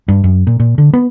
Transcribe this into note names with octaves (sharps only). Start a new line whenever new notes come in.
G2
F#2
A#2
A#2
D3
B3